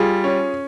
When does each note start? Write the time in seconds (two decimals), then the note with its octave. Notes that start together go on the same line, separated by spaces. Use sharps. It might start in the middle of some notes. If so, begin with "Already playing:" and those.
Already playing: G3 F4 G#4
0.24 C#4